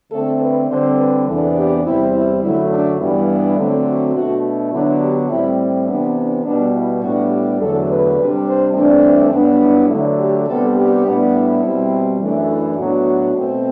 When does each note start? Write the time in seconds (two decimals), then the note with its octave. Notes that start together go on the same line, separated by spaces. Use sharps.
0.12 D3 A3 C4 A4
0.40 B4
0.69 D3 G3 C4 C5
0.98 B4
1.27 E2 C3 E3 B3 D4 A4
1.55 G4
1.85 E2 C3 G3 C4 E4
2.14 E4
2.42 F#2 D3 F#3 A3 E4
2.71 D4
2.99 G2 E3 G3 B3 D4 E4
3.57 D3 F#3 A3 C4
3.87 F#4
4.15 B2 A3 D4 F#4
4.72 D3 F#3 B3 D4 E4
5.01 G4
5.30 A2 G3 C4 E4
5.87 C3 E3 B3 D4
6.16 D4
6.44 B2 G3 B3 D4
6.74 E4
7.02 A2 G3 B3 D4 F#4
7.31 G4
7.59 E2 D3 F#3 A3 A4
7.89 B4
8.17 C3 G3 D4
8.47 C5
8.74 G2 E3 A3 C4 D4
9.32 G2 F#3 B3 D4
9.62 E4
9.89 D3 F#3 A3
10.19 G4
10.47 C3 G3 B3 D4 A4
10.76 G4
11.05 A2 G3 B3 D4
11.33 E4
11.62 B2 G3 C4
12.19 F#2 E3 A3 D4
12.48 E4
12.77 A2 F#3 B3 D4 F#4
13.35 B2 A3 C4